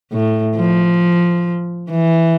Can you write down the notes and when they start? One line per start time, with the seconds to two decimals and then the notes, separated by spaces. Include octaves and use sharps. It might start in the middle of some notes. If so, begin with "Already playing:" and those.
0.12 A2
0.56 F3
1.91 E3